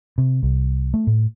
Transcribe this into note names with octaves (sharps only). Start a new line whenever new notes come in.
C3
C2
A3
A2